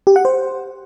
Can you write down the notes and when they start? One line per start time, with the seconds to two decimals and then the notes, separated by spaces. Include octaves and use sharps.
0.07 G4
0.16 F#5
0.25 C5